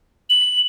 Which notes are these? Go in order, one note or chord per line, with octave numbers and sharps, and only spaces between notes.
F#7